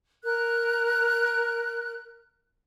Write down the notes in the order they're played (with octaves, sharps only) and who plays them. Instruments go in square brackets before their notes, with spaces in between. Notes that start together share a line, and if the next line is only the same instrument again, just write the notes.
[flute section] A#4 F#6